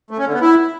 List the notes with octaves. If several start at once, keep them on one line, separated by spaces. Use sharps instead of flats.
A3
C#4
D3
B3
E4